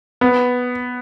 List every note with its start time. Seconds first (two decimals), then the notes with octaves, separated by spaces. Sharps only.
0.21 B3